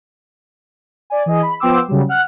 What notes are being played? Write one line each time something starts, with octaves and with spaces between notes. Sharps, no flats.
D5 G#5
E3 G#4 D#5
B5
F3 B3 G5 C6 D6 E6
C#3 F#3 G3
F#5 F6 F#6